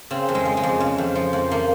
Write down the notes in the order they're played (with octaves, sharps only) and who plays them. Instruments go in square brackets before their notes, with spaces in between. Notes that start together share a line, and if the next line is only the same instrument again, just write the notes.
[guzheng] C#3 C4
F2
G#3
F3
G#3
F2
C#3
F2
F3
F2
F3 A#3